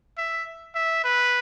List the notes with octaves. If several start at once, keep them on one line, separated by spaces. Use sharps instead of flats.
E5
E5
B4